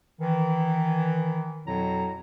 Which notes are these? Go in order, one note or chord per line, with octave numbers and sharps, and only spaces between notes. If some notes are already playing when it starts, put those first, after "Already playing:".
D#3 E3
F2 B2 F#3 E4 A#5